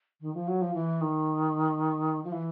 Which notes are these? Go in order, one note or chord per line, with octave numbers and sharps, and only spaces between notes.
D#3
F3
F#3
F3
E3
D#3
F3
E3